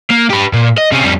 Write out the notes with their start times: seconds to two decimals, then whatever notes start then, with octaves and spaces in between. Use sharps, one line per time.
0.11 A#3
0.30 G4 B4
0.53 A#2
0.78 D#5
0.92 C3 C#4
1.04 F2 G3